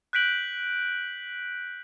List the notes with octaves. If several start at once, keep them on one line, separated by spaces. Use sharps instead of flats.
F#6 G6 B6 D7 F#7